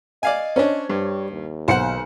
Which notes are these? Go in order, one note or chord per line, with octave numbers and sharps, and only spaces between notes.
D5 D#5 F5 G#5
C#4 D4 C5 C#5
G2 G3
D#2
B1 C5 F#5 C#7